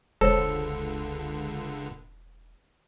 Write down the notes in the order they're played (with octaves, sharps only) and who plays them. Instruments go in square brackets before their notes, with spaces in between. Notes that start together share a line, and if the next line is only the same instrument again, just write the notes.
[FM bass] E1 [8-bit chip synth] C#2 D3 [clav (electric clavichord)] A4 [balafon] C5 C#5